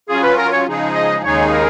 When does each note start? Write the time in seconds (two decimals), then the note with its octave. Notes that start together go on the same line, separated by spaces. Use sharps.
0.09 F#3 C#4 F4 G#4
0.23 B4
0.38 A#4
0.52 C#5
0.67 C#3 F3 G#3 D#4 G#4
0.95 D#5
1.24 D#2 C#3 G#3 D#4 G#4 C#5
1.53 A#4